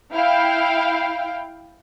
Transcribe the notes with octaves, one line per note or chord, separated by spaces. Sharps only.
E4 F5 G5